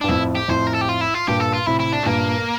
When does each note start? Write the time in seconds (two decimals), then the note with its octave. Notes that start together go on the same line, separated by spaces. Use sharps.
0.01 G2 D4
0.09 F2 A2 E4
0.35 G4
0.48 F2 A2 C5
0.67 A#4
0.74 A4
0.81 G4
0.89 F4
1.01 E4
1.14 F4
1.28 G2 A#2 G4
1.41 A4
1.54 F4
1.67 A2 C3 E4
1.80 E4
1.93 D4
2.03 A3
2.06 G2 A#2 A#3